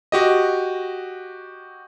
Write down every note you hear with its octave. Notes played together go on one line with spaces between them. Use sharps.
F#4 G4 D#5